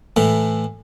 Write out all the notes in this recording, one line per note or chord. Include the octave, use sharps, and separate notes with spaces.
A2 E3